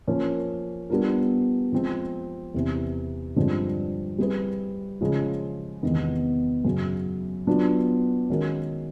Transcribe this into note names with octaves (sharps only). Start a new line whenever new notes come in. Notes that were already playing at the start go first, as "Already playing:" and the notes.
F3 A#3 C#4
G3 B3 D4 F4 A#4
F3 G#3 C4
E2 C3 E3
G2 D3 F3 G#3 C4
G3 C4 E4 G#4 B4
C#3 F3 G#3 C#4 F4
E2 C3 D#3 G#3 B3
F#2 C#3 F#3
F#3 B3 D4 F4
D#3 G#3 C#4 F#4 A#4